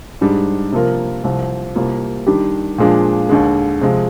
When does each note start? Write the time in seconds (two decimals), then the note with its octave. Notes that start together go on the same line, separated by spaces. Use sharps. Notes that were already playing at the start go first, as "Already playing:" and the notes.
0.21 G#2 G3 D4 G#4
0.72 C3 F3 A#3 F4 A#4
1.24 C2 C3 F3
1.75 C2 C3 G3 A#3 F4
2.27 D#3 G3 D4 G4
2.78 A#2 F3 G#3 D4
3.29 D#2 D3 G#3
3.81 C3 F3 G#3